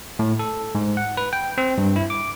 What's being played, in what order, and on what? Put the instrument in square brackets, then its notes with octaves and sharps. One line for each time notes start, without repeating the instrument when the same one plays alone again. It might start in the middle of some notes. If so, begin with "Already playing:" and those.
[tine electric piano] A2
A4
G#2
F#5
B4
G5
C4
G2
E4
D6